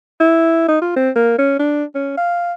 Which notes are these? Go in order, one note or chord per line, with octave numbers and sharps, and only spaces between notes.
E4
D#4
F4
C4
A#3
C#4
D4
C#4
F5